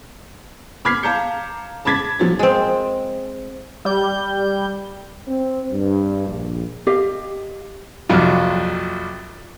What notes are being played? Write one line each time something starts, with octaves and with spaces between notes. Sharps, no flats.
B5 D6 F6 G#6 B6 C7
F5 A5 A#5 D6 G6 C#7
A5 B5 D6 G#6 A6 B6
F3 F#3 A6
G#3 C4
G3 G6
C4
G2
A#1
G4 D#5 F5
A#1 F2 C3 F#3 F4